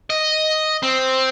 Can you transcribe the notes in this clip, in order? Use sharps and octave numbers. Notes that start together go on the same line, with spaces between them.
D#5
C4